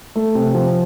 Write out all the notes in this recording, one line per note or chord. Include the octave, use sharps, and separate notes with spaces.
A3
C3
F3